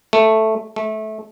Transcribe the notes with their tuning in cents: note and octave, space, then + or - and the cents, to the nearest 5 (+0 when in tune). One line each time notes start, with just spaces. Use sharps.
A3 +0
A3 -20